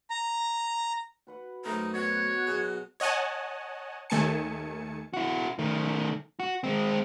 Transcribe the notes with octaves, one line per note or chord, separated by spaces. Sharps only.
A#5
F#4 B4 F#5
F#2 A3 C4 D#4 A#5
B2 B3 F#4 C#5
B2 F#3 G#4
C#5 D#5 F#5 G#5 A5
D#2 D#3 A3 G#5 A5 C#7
E4 F#4
D#3 A3
F#4
G#3 C4